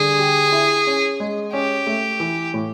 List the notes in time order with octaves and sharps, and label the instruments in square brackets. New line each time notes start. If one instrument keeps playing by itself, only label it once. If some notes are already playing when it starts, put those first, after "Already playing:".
Already playing: [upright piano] D3 G3 [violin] G#4
[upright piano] G4
E4
C#4
G#3
[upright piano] C#4 [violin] G4
[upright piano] A3
E3
A2